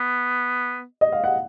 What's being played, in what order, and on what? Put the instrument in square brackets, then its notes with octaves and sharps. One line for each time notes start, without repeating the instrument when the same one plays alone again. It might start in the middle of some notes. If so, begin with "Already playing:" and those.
Already playing: [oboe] B3
[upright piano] D#5
F5
F#5